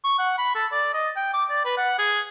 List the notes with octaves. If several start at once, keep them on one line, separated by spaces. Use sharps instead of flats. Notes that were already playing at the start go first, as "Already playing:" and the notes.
C#6
F#5
B5
A4
D5
D#5
G5
D6
D5
B4
F#5
G#4